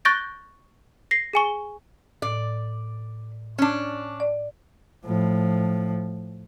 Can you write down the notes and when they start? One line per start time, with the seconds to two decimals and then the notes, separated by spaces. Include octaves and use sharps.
0.05 C#6 F#6 G6 A6 A#6 D7
1.11 A#6 C7
1.33 G#4 G#5 C#6
2.22 A2 D5
3.58 C#4 D4
4.20 D5
5.05 A2 F3